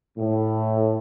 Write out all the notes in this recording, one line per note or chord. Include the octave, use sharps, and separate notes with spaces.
A2